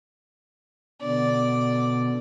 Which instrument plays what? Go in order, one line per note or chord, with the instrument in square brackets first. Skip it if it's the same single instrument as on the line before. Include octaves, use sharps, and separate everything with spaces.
[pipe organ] B2 D3 [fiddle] D5